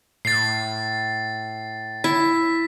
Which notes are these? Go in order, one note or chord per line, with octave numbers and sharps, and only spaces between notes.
A2 A6 C7
E4 B6